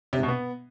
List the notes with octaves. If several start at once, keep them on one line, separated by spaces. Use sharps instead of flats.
C3
G#2
B2
B3